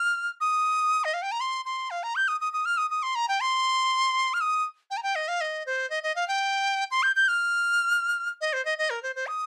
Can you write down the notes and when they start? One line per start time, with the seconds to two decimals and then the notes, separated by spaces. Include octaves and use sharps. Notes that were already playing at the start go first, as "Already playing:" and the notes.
Already playing: F6
0.41 D#6
1.04 D#5
1.14 F5
1.22 G5
1.32 A#5
1.40 C6
1.66 C6
1.91 F5
2.03 A#5
2.16 G6
2.28 D#6
2.41 D#6
2.53 D#6
2.65 F6
2.77 D#6
2.91 D#6
3.03 C6
3.15 A#5
3.29 G5
3.41 C6
4.34 F6
4.41 D#6
4.91 G5
4.97 A#5
5.03 G5
5.15 D#5
5.28 F5
5.41 D#5
5.66 C5
5.90 D#5
6.03 D#5
6.16 F5
6.28 G5
6.91 C6
7.03 G6
7.16 G6
7.28 F6
8.41 D#5
8.53 C5
8.65 D#5
8.78 D#5
8.90 A#4
9.03 C5
9.15 C5
9.28 D#6